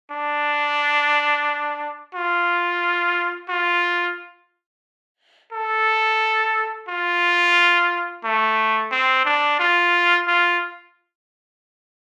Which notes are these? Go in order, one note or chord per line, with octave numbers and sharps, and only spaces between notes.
D4
F4
F4
A4
F4
A3
C4
D4
F4
F4